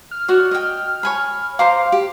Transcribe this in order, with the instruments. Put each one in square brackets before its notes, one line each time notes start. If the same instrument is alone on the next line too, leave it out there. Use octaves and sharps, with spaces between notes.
[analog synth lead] F6
[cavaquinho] F#4 C#5 D5
D#5 G5
C#5 G#5 B5
[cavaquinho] C5 A#5 D6 [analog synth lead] F5
[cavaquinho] G4